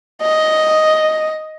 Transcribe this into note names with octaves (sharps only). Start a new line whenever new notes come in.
D#5